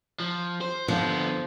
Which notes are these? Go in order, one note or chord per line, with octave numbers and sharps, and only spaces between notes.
F3
C5
D3 F3 B3